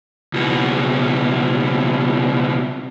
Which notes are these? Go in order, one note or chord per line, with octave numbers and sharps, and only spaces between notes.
C#2 B2